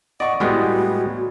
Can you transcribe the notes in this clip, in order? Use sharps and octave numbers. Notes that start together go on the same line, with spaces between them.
D5 D#5 F#5 C#6
A2 G3 G#3 B3 F#4